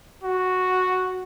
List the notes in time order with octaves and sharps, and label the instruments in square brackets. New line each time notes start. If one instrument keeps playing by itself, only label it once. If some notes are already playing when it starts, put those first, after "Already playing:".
[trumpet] F#4